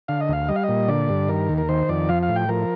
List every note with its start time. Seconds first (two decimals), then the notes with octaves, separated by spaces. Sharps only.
0.08 D3 F5
0.21 D#5
0.29 D2 F5
0.48 G3 D#5
0.56 F5
0.64 D#5
0.69 A#2
0.88 D3 D5
1.09 G2
1.28 D#3 A#4
1.49 D#2
1.58 A#4
1.69 D#3 C5
1.89 F2 D5
2.09 F3 F5
2.23 F5
2.29 A2
2.36 G5
2.49 F3 A#4